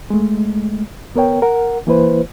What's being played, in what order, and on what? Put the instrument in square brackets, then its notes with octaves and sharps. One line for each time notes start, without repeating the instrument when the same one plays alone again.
[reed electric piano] G#3 A3
D2 B3 A#4 C#5 G5
A#4 F#5
E3 A#3 E4 B4 C5